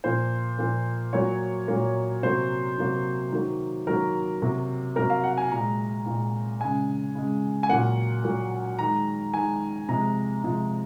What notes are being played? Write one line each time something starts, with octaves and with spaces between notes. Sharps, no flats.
A#2 F3 A#3 C5
A#2 F3 A#3
A#2 F#3 A#3 C#5
A#2 F#3 A#3
C3 F#3 A#3 C5
C3 F#3 A#3
D#3 F#3 A#3
D#3 F#3 A#3 A#4
C3 F#3 A#3
C3 F#3 A#3 A#4
F5
F#5
G#5
A#2 G#3 A#5
A#2 G#3
C#3 G#3 G#5
C#3 G#3
G#5
A#2 F#3 A#3 F#5
A#2 F#3 A#3
D#3 G#3 A#5
D#3 G#3 G#5
C3 F3 G#3 A#5
C3 F3 G#3